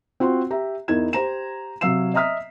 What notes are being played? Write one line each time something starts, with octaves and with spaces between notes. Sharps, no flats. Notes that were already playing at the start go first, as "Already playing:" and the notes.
C4 F4 F#4 C6
G4 E5 A#5
E2 D#4 E4 A#4 G#6 E7
G4 C5 A#5 E7
C3 F#3 F5 E6 C7 E7
D#5 E5 A#5 D#6 F6 B6